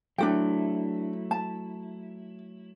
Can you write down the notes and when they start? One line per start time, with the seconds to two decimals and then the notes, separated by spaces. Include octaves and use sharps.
0.18 F#3 A3 D4 E4 F#4 G5
1.31 A5